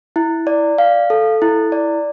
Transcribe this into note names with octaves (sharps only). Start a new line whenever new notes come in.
E4
D5
F5
A4
E4
D5